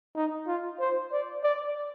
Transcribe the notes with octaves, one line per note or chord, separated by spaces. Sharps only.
D#4
F4
C5
D5
D5